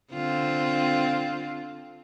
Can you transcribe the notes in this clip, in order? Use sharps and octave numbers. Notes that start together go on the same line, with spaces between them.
D3 C4 F4